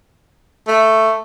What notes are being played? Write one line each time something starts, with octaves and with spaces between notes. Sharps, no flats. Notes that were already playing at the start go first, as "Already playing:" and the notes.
A3